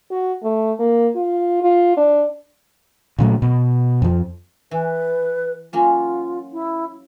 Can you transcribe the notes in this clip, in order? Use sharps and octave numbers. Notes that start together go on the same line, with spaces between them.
F#4
A3
A#3
F4
F4
D4
A#2 C#3 F#3 A3
B2
F2 F3
E3 B4
F#3 A#3 C#4 F4
E4